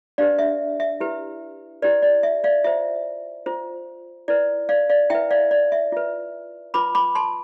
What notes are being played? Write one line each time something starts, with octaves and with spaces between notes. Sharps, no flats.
D4 G4 B4 D5 F5
E5
E5
E4 G4 B4
E4 G4 B4 D5
D5
E5
D5 F5
F4 C5 E5
F4 C5
E4 B4 D5
D5 F5
D5 F5
E4 B4 E5 G5
D5 F5
D5
E5
F4 B4
F4 B4 B5 D6
B5 D6
A5 C6